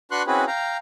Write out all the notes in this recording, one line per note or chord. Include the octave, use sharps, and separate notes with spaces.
D4 F#4 B4 C6 C#6 F#6
C4 C#4 E4 F#4 G#4 B4
F5 G5 A#5